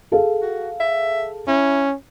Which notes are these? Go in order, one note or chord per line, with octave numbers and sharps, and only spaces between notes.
G#4 A4 F5
F#4
E5
C#4 E4